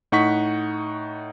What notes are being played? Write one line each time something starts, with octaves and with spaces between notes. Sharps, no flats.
A2 D#4 F#5 C#6 B6